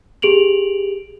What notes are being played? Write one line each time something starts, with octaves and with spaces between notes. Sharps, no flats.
G4 G#4 D7 F7 F#7